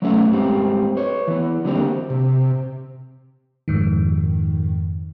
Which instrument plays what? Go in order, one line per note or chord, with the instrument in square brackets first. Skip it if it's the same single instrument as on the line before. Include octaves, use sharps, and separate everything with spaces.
[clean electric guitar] F#3 A3 B3 C#4 A4 E5
G#2 G3 C4 G4
B4 C#5
E3 B3
D3 F#3 G3 A#3 C4
[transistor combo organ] C3
[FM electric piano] F2 G#2 D#3